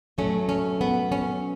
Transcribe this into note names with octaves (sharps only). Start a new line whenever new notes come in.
B2 F#3 A3 C#4
C#4
B3
C#4